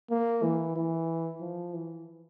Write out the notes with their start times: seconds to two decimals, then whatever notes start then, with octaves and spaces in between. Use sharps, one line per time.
0.11 A#3
0.43 E3
0.76 E3
1.41 F3
1.74 E3